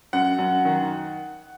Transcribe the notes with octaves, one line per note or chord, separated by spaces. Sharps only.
F#2 F#5
F#2
D#3